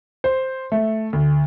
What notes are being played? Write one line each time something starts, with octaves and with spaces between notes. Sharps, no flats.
C5
A3
D2